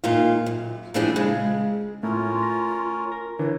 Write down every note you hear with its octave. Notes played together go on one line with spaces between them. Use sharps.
A#2 D#3 F4
F#2
A#2 E3 F3 G3 D4 G#4
C#3 G#3
A2 A3 C#4 E4 F4 A#4
A#6
A#4
D3 E3 D4 C#5